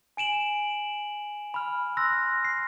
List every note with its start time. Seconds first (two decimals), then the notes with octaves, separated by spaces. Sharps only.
0.17 G#5 D7 E7 F#7
1.54 B5 F6
1.97 C6 E6 F#6 A#6
2.45 C7